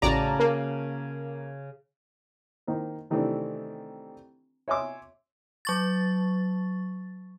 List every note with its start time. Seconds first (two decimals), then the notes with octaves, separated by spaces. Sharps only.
0.02 A1 C#3 F#4 D5 A5 A#5
0.40 A#3
2.67 D#3 A#3 C5
3.10 C3 D#3 E3 A3 C4 D4
4.68 C#5 E5 G#5 C6 D6 E6
5.65 F#3 C#6 A6